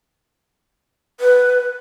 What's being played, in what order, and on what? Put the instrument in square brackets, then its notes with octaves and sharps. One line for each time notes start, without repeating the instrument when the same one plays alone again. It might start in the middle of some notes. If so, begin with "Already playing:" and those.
[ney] B4